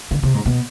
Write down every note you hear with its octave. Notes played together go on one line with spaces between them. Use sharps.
D3
C3
G#2
B2